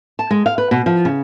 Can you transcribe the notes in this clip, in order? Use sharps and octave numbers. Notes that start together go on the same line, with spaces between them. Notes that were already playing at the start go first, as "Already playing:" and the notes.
A5
G#3
F5
B4
B2
F3
C#3